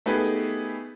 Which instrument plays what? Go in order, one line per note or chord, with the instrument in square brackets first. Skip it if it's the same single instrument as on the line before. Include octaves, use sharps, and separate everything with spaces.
[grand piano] A3 B3 D#4 G4 G#4 B4